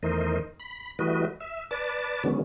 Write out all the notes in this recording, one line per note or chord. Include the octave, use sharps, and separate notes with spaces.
E2 D#3 A3 A#4 C5 D#5
B5
E3 G3 A3 F#4 B4 D#5
E5
B4 D5 A5
D3 D#3 F#3 G#3 B3 C#4